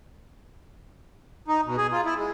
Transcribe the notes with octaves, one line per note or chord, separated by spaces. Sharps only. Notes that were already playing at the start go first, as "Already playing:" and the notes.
D#4
B2
G#4
F4
E4
G#3